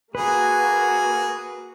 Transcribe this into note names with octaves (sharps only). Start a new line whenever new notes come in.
A#3 F#4 G#4 B4